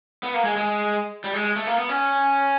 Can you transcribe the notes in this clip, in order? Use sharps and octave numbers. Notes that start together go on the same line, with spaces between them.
B3
A#3
G#3
G#3
G3
G#3
A3
A#3
B3
C#4